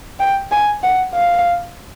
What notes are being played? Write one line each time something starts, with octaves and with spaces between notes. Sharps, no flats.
G5
G#5
F#5
F5